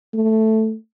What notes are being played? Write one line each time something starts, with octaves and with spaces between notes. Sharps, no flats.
A3